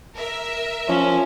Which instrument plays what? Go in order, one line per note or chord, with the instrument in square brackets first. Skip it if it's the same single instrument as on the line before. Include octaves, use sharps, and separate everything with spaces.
[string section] A#4 E5
[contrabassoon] F3 [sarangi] C#4